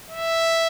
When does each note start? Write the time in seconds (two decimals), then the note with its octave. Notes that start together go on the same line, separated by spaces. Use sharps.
0.11 E5